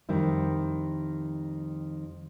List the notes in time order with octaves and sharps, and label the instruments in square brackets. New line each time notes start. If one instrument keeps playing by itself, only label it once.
[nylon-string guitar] F2 D#3 G3 E4